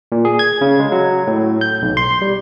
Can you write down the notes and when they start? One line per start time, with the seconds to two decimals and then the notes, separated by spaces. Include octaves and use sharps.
0.12 A#2
0.25 G#4
0.39 G#6
0.61 C#3
0.80 G#3
0.92 F#3
1.27 A2
1.61 G6
1.82 B1
1.97 C6
2.22 G3